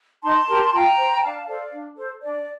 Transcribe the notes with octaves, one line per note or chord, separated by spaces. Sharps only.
D#4 A5 C6
G4 A#4
F4 G5 A#5
C5
D4 F5 A5
A4 C5 D5 F5
D4
A4 C5
D4 D5